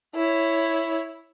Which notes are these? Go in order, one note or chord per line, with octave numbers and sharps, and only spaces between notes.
E4 C#5